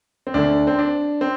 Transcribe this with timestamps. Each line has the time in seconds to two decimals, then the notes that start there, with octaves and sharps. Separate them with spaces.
0.27 C4
0.34 D2 D3 D4
0.67 C4
0.79 D4
1.21 C4